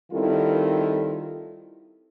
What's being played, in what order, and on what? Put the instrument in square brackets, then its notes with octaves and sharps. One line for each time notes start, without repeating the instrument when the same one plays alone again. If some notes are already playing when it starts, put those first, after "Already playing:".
[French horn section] D#3 G3 C4 E4 F4 A4